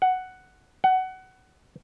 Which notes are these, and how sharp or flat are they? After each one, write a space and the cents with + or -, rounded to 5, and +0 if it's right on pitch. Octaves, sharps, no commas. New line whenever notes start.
F#5 +5
F#5 +20